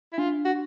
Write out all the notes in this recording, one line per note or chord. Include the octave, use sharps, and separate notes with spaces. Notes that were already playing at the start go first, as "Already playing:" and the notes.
E4
D4 F4
F#4